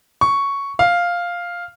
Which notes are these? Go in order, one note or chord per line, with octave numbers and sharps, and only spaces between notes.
C#6
F5